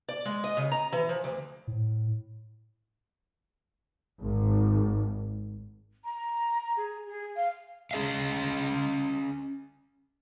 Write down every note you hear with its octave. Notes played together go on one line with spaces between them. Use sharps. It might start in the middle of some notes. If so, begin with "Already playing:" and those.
D5
G#3
D#5
C#3
A#5
E3
F3
D2
A2
G#1
A#5
G#4
G#4
F5
C#4 G#4 D#5 F5